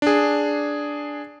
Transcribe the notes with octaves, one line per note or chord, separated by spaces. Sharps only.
D4 G#4